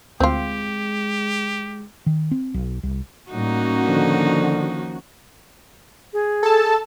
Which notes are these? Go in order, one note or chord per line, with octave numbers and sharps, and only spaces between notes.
D2 G#3 C4 F4 G4
D#3
C4
B1
C2
A2 G3 A#3 C#4 D#4 F#4
D3 D#3 F3
G#4
A4 A5